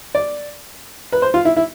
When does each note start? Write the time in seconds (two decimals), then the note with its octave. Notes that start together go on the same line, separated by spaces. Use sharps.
0.15 D5
1.12 B4
1.22 C5
1.34 F4
1.45 E4
1.56 E4